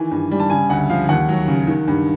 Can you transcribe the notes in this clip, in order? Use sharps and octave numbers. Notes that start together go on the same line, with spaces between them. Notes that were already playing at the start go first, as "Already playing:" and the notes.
Already playing: D#3 E3 G#5
G2
G3
A5
C#3 G#5
D2 F#5
F3 F5
D#2 F#5
F#3
C#3
D#3
G2